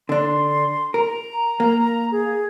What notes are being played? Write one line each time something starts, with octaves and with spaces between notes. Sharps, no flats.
D3 D4 C6
A#4 A#5
A#3
G#4